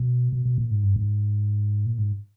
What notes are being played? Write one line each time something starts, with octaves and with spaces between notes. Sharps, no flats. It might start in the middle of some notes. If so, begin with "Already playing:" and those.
Already playing: B2
B2
B2
A#2
G#2
G2
G#2
A#2
G#2